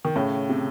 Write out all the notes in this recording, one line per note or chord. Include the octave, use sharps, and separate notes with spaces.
D#3
A2 C#3
C3